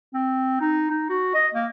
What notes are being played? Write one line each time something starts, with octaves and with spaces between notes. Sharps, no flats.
C4
D#4
D#4
F#4
D#5
A#3